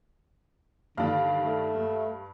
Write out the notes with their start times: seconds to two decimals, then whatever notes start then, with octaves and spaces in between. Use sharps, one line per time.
0.97 G2 D3 D#3 D4 F5
1.45 A3
1.75 G2